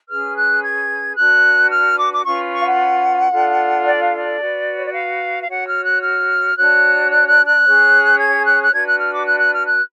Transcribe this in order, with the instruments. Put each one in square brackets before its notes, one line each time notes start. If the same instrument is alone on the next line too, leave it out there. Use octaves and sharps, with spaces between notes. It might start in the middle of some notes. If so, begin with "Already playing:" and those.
[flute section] C#4 G#4 B4 F6
F#6
G#6
D4 F#4 B4 F#6
F6
D6
D6
C#4 F4 B4 C#6
C#6
F5
F#5
D4 F4 A4
D5
F5
D5
F#4 B4
C#5
D5
F5
F5
F#4 C#5 F#5
F6
F#6
F6
D4 F#4 C#5 F#6
F#6
F#6
F#6
C#4 G#4 C#5
G#6
F#6
F#6
D4 F#4 B4 G#6
F#6
F6
D6
F#6
F#6
F6
F#6